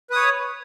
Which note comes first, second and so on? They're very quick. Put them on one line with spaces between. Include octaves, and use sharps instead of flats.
B4 D#6 C#5